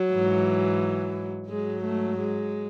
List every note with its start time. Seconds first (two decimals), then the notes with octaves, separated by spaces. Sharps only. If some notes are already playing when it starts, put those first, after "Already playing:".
Already playing: F#3
0.11 G#2 E3
1.50 G#2 F#3 G#3
1.85 A3
2.20 G#3